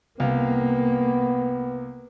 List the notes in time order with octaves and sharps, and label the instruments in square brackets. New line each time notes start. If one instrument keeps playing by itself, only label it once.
[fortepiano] C2 F5 [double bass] A#3 [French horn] B3